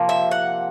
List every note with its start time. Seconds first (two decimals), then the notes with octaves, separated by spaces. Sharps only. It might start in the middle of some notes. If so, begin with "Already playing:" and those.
Already playing: C3 F3 A#3
0.09 E5
0.31 F#5